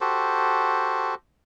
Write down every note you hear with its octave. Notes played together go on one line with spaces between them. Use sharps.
F#4 G4 A4 C5